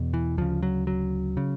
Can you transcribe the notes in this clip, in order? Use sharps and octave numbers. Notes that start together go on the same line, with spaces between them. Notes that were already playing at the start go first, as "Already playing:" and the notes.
Already playing: E2 B2
E3
D2 C#3 F3
F#3
F#3
C#3